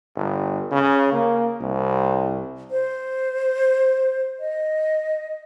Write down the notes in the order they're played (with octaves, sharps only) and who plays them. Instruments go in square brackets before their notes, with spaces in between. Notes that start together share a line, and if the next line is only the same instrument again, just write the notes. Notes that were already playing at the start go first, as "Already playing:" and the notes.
[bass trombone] G1
C#3
A#3
C2
[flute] C5
D#5